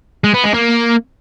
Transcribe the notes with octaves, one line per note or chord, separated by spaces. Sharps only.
G#3
B3
G#3
A#3